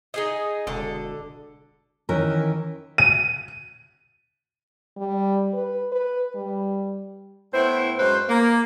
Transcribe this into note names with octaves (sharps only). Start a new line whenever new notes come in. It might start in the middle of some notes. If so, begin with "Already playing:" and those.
D#4 G#4 D#5
E1 D3 A4
D#3 E3 C#4 A#4
D#7
G3
B4
B4
G3
A2 B3 E4 C5 G5
F#2 G#3 B4 C5
A#3